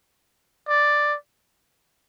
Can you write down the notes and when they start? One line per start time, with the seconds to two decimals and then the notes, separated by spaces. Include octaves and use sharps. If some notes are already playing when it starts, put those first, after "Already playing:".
0.68 D5